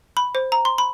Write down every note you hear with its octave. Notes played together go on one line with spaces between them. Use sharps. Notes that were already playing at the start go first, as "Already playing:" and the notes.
B5
C5
A#5
C6
B5